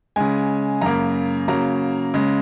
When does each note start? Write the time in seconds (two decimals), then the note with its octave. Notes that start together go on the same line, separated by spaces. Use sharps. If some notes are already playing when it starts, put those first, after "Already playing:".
0.16 C#3 G#3 G#5
0.81 F#2 C#3 A#3 A#5
1.48 C#3 F#3 A#3 A#5
2.14 C#3 G#3